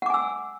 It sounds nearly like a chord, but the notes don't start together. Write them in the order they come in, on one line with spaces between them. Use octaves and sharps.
F#5 D6 G#5 E6